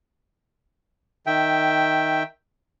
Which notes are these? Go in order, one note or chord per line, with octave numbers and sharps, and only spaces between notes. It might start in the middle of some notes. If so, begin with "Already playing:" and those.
D#3 E5 G5